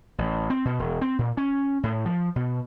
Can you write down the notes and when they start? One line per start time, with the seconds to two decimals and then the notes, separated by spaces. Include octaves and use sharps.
0.18 A1
0.50 C4
0.65 B2
0.79 E1
1.01 C4
1.19 A#2
1.37 C#4
1.83 A2
2.06 F3
2.36 B2